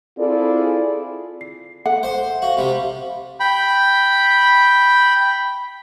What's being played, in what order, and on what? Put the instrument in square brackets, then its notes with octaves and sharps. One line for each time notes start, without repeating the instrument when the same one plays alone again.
[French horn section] C4 E4 F4 G#4 A4 D5
[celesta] C7
[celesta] A4 E5 [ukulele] F#5
[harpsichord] C5 C6
[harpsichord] F#4 [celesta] F5
[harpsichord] C3 G3
[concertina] G5 B5